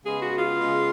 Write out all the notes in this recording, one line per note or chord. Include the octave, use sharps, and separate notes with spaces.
C#3 G#3 B3 G#4
F#4
F4
C#3 G#3 B3